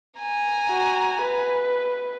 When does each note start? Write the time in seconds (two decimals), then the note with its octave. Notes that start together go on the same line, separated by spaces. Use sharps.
0.18 G#5 A#5
0.69 F#4
1.22 B4